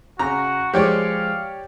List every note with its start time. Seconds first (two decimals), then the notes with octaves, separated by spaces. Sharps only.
0.19 C#3 F#4 A#5
0.74 F3 G#3 G4 C#5 D5 F5